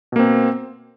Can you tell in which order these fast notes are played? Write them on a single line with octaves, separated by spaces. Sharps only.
B2 A#3 C4